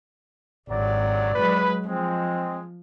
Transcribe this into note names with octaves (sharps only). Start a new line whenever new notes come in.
G#1 G2 C3 F#3 D5
F#3 G#3 B4
F3 G#3 C4